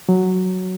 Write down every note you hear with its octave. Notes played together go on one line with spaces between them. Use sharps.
F#3